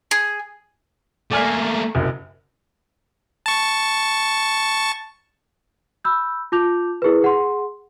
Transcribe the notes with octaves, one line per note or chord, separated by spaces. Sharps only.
G#4
A3 A#3 D5 G#5 F6
F#1 C2 F#2
A5 C#6
B5 E6 G6
F4 A5 D6 G6 F7
E4 G#4 A#4 B4
G#4 F#5 C6